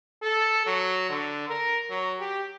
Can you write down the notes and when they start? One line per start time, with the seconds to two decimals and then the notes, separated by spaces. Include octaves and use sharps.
0.23 A4
0.66 F#3
1.10 D3
1.49 A#4
1.90 F#3
2.20 G4